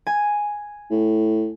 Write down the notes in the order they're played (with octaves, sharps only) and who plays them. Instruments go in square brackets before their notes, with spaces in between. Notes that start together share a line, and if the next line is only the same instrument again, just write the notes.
[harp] G#5
[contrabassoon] A2